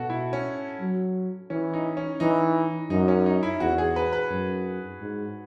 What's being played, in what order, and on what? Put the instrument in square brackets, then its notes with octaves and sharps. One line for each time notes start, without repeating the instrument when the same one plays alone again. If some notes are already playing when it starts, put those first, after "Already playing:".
Already playing: [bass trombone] B2 [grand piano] F#4 A4
[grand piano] E4
C#4
[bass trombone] F#3
[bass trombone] E3 [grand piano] C#4
[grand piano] D#4
C#4
[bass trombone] E3 [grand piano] D#4
[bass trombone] F#2 [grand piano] D#4
[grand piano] C#4
D#4
E4
[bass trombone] E2 [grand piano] F#4
[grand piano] G#4
B4
B4
[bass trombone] F#2
G#2